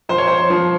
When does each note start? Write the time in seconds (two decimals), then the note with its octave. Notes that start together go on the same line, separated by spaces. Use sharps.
0.09 F3 C5
0.18 C#5
0.28 C5
0.50 F3